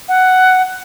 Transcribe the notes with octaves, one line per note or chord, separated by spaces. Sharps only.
F#5